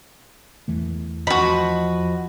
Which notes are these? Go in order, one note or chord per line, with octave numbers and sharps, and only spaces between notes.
E2 E3 A3
F3 F#4 D#5 B5